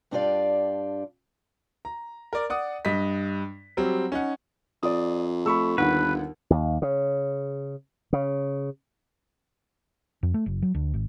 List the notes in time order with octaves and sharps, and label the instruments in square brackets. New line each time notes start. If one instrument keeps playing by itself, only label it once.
[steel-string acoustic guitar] G2 D4 F4 G4 D5 F5
[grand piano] A#5
A#4 D5
D5 F#5 D#6
G2 D#5 B6
F#3 G3 C4
C#4 D#4 F#5
[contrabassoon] F2 [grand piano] D5 D#6
[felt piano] A3 [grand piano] B5 C#6 E6
[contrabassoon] G1 [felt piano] D#2 F#5 [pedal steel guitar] B4
[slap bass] D#2
C#3
C#3
[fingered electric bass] F2
A3
F#1
F#3
D2
G#1